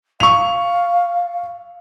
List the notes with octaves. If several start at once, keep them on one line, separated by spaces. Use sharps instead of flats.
F5 C#6 F7